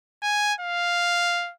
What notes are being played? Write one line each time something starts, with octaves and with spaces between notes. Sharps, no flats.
G#5
F5